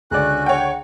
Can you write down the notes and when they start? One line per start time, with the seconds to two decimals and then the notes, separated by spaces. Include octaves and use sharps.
0.11 C#2 D3 C#4 F#4 D5 F#6
0.46 C#5 F#5 G5